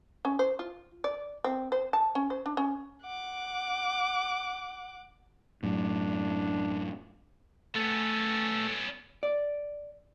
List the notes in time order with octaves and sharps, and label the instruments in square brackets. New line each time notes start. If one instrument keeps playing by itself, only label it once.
[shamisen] C#4
C5
F4
D5
C4
C5
A5
C#4
C5
D4
C#4
[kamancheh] F#5 D6
[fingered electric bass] F#2 A2 [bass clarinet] D4
[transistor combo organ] A3 A4 [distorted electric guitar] B3 C#4
[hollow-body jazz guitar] D5